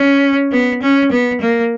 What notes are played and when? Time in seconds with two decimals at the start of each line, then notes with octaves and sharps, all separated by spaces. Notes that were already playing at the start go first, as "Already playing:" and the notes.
Already playing: C#4
0.52 B3
0.82 C#4
1.11 B3
1.41 A#3